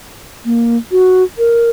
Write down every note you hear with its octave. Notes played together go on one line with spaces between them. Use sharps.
A#3
F#4
A#4